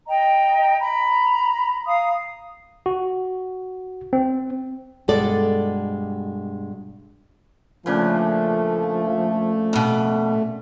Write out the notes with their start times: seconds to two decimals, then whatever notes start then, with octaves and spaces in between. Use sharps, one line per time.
0.07 D#5 G5 A#5
0.79 A#5 B5
1.86 F5 A#5 D#6
2.86 F#4
4.13 C4
5.08 G2 B2 G#3 A4 D5
7.86 A#2 C#3 F3 A3 D4
9.73 F2 B2